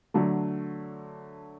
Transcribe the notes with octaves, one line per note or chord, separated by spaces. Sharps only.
D3 F#3 A3